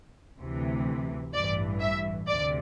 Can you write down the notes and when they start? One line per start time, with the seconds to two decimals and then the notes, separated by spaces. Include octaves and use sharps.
0.38 D2 C3 E3
1.33 A1 G2 E3 D5
1.80 E5
2.27 D2 C3 D5